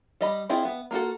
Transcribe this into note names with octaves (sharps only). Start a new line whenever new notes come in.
G3 D#5 B5
C4 E4 F4 G#4 D#5
B3 E5
A#3 F4 F#4 A4